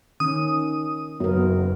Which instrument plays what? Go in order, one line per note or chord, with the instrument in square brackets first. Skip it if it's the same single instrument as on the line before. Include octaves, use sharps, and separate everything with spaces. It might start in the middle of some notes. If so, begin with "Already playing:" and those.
[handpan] D#3 C#4 [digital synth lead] D#6
[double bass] F#1 [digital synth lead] F#2 [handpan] B3 A#4